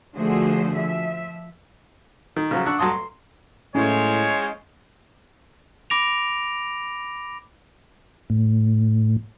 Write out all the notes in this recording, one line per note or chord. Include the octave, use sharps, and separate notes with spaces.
D3 F3 A3 F#4 G#4 C5
F3 E5
D#3
C#3 F3 F#3
D4 F#5 C#6 E6
G2 F#3 A5 C6 D#6
C6
A2 G#3 C#4 E4 F4 C5 C#5
B5 D6 A#6 D7 F7
A2